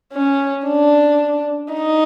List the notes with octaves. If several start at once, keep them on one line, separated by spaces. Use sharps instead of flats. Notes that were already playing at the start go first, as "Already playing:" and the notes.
C#4
D4
D#4